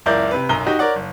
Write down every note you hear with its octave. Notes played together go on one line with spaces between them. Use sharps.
F#1 C#2 E4 A#4 D5 G6
C3 B4
B1 F#2 A#5 G7
D#4 F#4 G4
A#4 C#5 D5 F#5
F#1